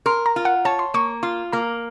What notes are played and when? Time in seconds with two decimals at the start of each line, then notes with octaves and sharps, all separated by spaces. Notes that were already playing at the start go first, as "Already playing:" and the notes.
0.06 A#4 C6
0.26 A#5
0.36 F4
0.45 F#5
0.65 C#5 A5
0.79 C6
0.94 A#3 C#6
1.23 F4 C6
1.53 A#3 A#5